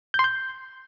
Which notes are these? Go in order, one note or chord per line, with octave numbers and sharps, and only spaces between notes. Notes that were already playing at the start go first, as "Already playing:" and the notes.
G6
C6
G6